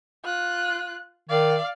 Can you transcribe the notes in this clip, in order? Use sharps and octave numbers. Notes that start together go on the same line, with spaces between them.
F4 F#6
D#3 D5 F5